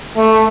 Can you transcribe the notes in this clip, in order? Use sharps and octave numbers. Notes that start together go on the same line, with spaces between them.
A3